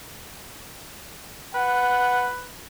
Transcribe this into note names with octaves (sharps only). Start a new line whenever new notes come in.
B4 F#5